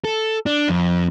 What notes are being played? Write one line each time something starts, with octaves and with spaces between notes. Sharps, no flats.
A4
D4
F2